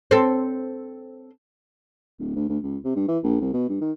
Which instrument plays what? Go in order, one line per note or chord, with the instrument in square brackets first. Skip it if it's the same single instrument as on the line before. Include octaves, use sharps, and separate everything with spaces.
[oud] C4 A4
[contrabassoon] D1
D2
D2
C#2
C3
G2
E3
A#1
C2
B2
G2
D#3